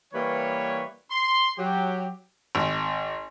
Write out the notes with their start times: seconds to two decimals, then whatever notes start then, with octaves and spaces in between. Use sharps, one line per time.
0.13 E3 G3 A#3 B4 C#5
1.10 C6
1.57 F#3 G4
2.55 G#1